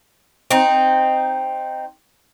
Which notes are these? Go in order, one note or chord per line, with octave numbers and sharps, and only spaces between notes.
C4 D#4